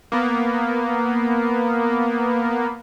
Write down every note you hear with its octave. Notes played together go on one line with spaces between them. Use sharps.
A#3 B3